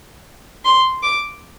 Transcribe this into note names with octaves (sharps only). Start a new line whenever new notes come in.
C6
D6